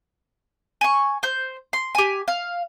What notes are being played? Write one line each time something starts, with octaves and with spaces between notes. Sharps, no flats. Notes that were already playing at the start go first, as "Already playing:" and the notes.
G#5 C#6
C5 G6
C6
G4 G#5
F5